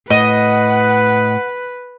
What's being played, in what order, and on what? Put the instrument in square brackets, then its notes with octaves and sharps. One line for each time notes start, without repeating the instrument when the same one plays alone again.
[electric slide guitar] A2 [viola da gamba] B4 [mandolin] D#5 [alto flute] F#5